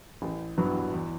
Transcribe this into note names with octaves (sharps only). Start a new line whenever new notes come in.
A1
G2 F#3 B3 E4
E2